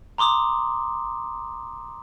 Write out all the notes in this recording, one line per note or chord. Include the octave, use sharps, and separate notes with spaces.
A#5 C6 D6 D#6